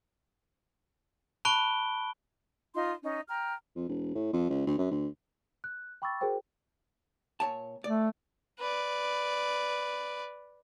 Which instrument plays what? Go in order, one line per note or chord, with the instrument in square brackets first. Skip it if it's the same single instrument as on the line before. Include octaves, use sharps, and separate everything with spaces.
[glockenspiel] A5 B5 C#6 F#6 D7 G7
[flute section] D#4 F4 C6
C#4 D#4
G5 A#5 F6
[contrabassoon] F2
E1
A2
F2
C#2
D2
F#2
D2
[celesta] F#6
G5 B5 C#6 D6 E6 A6
F#4 G#4 A#4 C5 G5
[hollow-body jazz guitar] A#2 C#5 A5
[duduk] A3 [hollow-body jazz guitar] D5
[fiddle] B4 D5